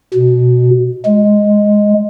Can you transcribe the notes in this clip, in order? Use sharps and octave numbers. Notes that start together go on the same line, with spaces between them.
B2
G#3